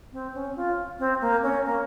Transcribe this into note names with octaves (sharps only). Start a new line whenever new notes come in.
C4
C#4
F4
C4
A#3
C#4
A#3